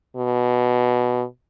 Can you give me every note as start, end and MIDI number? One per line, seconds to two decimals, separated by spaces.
0.16 1.24 47